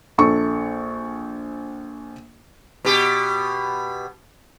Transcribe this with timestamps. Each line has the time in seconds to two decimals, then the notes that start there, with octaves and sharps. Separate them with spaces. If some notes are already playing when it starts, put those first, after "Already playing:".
0.18 A#1 A4 C#6
2.85 B2 G4